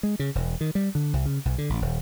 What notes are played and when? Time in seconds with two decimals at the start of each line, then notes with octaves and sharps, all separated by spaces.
0.03 G#3
0.19 C#3
0.35 E1
0.61 D#3
0.75 G3
0.95 D3
1.13 C2
1.26 C#3
1.45 B1
1.58 D3
1.70 A1
1.82 D#1